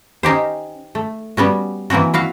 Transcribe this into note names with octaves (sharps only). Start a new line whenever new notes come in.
C#4 D#4 G4 C5
A3
G3 B3 C#4 F#4
E3 A#3 C4 C#4 F#4
E4 F#4 F5